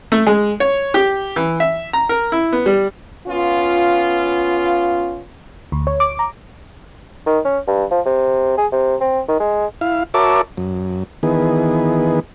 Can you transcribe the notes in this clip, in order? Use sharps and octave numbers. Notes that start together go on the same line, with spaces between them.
A3
G#3
C#5
G4
E3
E5
A#5
A#4
E4
B3
G3
B3 C#4 F4
D2
C#5
D6
A#5
D#3
C#4
G2
F3
C3
G#4
C3
C4
D#3
G#3
E4 F5
F#4 A#4 C#5 E5 A5 D6
F#2
D#3 E3 B3 G#4